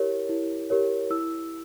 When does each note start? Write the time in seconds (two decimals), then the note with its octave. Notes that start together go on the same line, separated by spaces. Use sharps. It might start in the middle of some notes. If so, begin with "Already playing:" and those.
Already playing: E4 G4 A#4 C#5
0.29 E4
0.70 G4 A#4 C#5
1.10 E4 E6